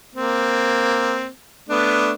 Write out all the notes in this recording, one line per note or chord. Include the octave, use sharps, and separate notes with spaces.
A#3 C4
A3 B3 D4